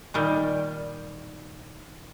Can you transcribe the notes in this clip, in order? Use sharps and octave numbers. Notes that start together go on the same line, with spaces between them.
A#2 D#3 G3